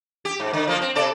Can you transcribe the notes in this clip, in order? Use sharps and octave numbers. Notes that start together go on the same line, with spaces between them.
G4
G#2
D3
F3 A#3 F4
C4
C3 A4 D5